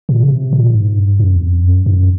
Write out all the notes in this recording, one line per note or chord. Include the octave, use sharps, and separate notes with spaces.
A#2
C#3
C3
A#2
G#2
G2
F#2
E2
F2
F#2
F#2